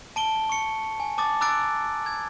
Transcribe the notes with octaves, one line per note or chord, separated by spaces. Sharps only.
A5 D7 G7
C#6 C#7
G#5
A5 D6 D#6 A6
A#5 D6 E6 F#6 A6 D7
G#6